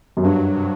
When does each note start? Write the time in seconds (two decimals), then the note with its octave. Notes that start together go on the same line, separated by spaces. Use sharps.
0.17 F#2
0.23 G2 F#3
0.56 C3